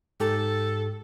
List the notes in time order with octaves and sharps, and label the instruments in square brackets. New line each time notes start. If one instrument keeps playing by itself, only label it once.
[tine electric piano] G#2 G4 [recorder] A4